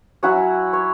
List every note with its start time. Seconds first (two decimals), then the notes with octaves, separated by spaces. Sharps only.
0.23 F#3 C#4 E4 F#5
0.73 C#5